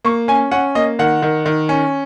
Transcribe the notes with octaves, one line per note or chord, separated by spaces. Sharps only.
A#3 C#6
C#4 G#5
C#4 F#5
A#3 D#5
D#3 F#5
D#3
D#3
C#4